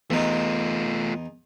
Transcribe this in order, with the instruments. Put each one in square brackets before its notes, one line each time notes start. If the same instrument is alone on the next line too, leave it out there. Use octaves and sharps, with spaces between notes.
[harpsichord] E2 D#4 [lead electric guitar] A3 F4